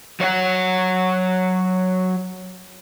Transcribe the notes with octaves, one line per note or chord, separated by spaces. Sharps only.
F#3 C#5 F5 F#5